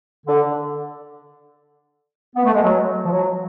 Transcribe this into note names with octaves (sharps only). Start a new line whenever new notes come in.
D3
B3
A3
G#3
F#3
F3
F#3